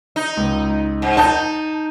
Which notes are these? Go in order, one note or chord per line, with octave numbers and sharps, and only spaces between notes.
D#4
C#2
G#2
D#4 A5 G6